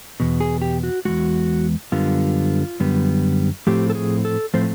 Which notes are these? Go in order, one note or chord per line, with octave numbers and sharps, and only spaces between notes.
E2 B2
G#4
G4
F#4
E2 B2 G#3 F#4
F#2 D3 G3 B3 F4
F#2 D3 G3 B3
A2 F3 A3 C4 G4
A4
G#4
A4
A2 F3 A3 C4 C5